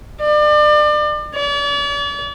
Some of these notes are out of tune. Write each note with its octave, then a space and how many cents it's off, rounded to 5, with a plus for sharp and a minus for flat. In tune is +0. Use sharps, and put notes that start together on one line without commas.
D5 +35
D5 -40